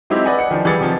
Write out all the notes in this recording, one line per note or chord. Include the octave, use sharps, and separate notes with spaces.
F#3 G#3 C4 D#4 E4 G4
B4 D5 D#5 F#5 G#5
F#5 C#7
D#3 F3 D4
E3 G3 G#4 A6 C#7
C3 D#3 F3